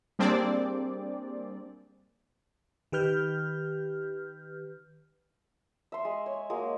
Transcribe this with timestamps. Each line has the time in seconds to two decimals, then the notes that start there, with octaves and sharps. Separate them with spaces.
0.19 G3 A#3 C4 D4 G#4 D5
2.92 D#3 G4 B4 F6 G6
5.92 E5 C6
6.05 G#3
6.26 C#5
6.50 G#3 A#3 F#4